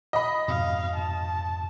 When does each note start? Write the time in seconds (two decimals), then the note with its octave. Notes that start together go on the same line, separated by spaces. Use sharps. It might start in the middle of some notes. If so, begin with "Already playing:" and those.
0.13 D#5 B5
0.48 F2 G#2 B2 F5
0.96 A5